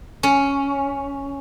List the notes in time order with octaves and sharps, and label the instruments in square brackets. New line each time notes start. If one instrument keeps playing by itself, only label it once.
[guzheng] C#4